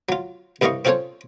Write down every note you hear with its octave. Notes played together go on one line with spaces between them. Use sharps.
F#3 F4
C2 G2 E3 D#5 F5 C#6
C4 C#4 F4 A4 C5 C#5